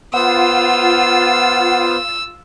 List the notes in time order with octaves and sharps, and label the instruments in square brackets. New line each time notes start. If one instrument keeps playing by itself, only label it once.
[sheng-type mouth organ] B3 C5 [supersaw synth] F4 [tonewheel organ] F#5 [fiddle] E6